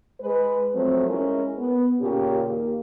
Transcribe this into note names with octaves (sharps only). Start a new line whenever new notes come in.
G#3 B4
F3 F#3 A3 C4
G#3 C#4 E4 A#4
B3
A#2 C#3 C#4 G4
D#2 A#3 G4